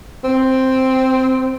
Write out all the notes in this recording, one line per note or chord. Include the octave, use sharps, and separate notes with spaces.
C4